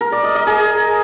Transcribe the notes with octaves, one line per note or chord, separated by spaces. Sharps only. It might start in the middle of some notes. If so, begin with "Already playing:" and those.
A#4
D5
D#5
D#5
G#4